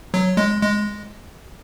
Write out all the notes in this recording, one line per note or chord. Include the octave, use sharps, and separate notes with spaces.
F#3
G#3
G#3